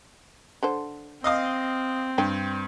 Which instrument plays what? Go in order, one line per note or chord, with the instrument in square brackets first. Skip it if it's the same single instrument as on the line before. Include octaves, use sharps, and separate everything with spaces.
[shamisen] D3 A4 C5
[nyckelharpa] C4 [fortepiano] D#5 F5 D#6
[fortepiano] G2 [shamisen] D4 G5